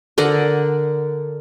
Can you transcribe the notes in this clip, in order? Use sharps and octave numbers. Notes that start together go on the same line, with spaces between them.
D3 A#4 D5 F#5